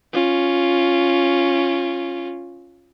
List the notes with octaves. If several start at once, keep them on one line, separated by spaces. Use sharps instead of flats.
C#4 F4